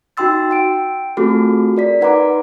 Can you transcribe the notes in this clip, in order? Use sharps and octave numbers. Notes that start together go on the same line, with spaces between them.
D#4 F#4 G5 C6 E6 A6
F#5 G5 D7
A3 C4 F4 F#4 G#4 A4
A#4 D5 B6
D#4 B4 F#5 A#5 C6 D6